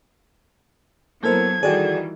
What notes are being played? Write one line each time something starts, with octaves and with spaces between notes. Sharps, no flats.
F#3 A#3 B3 E4 A4 A#4 C5 G#6
D#3 E3 G3 F#4 G#4 A4 D5 G5